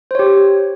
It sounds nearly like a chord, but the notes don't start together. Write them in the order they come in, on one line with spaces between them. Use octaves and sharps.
C5 C#5 G4